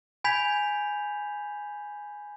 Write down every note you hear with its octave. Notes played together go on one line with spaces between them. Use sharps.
G#5 B5 G6 G#6 B6 F7